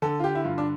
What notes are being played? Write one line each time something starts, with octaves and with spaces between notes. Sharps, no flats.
D3 A4
F4
G4
E4
G2 F4
D4